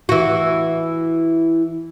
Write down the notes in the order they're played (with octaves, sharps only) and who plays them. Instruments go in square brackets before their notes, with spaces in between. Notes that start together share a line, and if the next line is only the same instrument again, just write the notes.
[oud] E3 F#4